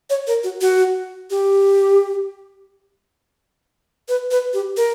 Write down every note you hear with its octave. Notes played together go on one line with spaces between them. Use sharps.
C#5
A#4
F#4
F#4
G4
B4
B4
G4
A#4